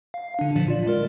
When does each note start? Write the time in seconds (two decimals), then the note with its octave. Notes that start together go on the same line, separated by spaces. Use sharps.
0.14 F5
0.39 D3 D4
0.56 A#2 D3 F3
0.68 F4 D5
0.87 G#3 A#4